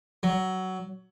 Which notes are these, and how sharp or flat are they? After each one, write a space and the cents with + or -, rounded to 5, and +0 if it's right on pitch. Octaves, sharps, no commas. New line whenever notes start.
F#3 +15